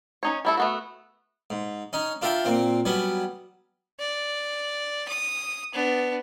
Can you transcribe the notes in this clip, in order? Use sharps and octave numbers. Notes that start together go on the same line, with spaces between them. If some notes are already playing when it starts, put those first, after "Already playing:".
C#4 D#4 C#5
G3 E4 A4
A3 B3 F#4
G#2
C#4 D#4
D4 F4 A#4 E5 G5
A#2 C4
F#3 G3 B3 C#4
D5
D#6
B3 D4